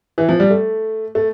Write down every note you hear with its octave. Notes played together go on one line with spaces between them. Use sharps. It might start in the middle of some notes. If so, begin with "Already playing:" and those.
E3
F3
G3
A3
A3